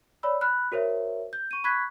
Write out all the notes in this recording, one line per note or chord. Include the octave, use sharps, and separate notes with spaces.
C#5 D5 B5 E6
B5 F6 F#6
F#4 A#4 C5 C#5 E5
G6
C#6 D#7
B5 C#6 F#6 G#6 B6